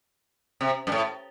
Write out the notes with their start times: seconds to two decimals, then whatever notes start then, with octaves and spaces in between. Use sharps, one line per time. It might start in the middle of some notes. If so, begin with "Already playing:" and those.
0.61 C3
0.87 G2
0.92 A2